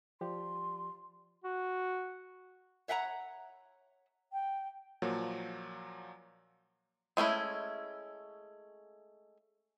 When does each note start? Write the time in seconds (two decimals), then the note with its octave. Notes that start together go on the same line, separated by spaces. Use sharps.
0.21 F3 G4 D5 C6
1.44 F#4
2.88 C#5 E5 F#5 G5 A#5
4.32 G5
5.02 A#2 F3 F#3 A#3 F#4 C#5
7.17 G#3 A3 C#4 E4